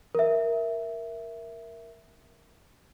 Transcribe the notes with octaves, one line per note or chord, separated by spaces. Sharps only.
A#4 E5